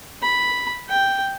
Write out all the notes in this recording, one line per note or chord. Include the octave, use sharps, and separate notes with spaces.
B5
G5